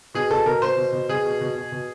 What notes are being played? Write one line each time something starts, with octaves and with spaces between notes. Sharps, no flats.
B2 G#4
B2 A4
B2 A#4
B2 C5
B2
B2
B2 G#4
B2
B2
B2
B2